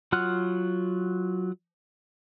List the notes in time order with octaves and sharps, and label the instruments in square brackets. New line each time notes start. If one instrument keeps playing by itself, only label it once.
[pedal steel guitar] F#3 F4 F#5 F6 F#6